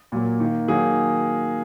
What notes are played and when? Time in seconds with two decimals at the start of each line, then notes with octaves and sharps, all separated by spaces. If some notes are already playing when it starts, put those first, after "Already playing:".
0.12 A#2 F#3 A#3
0.40 D#3 A#3
0.68 D#3 F#3 A#3 G#4